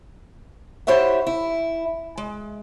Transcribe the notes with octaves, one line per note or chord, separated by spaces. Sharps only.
E4 G4 C5 C#5 E5 F#5
E4
G#3